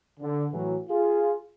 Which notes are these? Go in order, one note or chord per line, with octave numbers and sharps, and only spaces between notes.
D3
A2 E3 F#3
F4 G#4